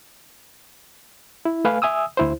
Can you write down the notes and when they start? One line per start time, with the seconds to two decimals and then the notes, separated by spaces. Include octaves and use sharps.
1.45 E4
1.65 A3 B4 F5 G#5
1.82 E5 G#5 D#6 E6
2.17 D2 E4 C5